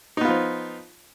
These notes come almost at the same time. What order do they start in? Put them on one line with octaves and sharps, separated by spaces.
D#4 B3 F4 F3